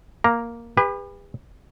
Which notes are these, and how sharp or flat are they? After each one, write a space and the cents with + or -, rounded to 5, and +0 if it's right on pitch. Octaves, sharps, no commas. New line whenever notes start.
A#3 +0 A#5 +0
G4 +45 B4 +0